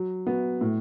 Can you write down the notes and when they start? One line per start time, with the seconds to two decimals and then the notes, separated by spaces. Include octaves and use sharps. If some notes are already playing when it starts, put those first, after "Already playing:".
Already playing: F#3
0.26 B3 F#4
0.61 A2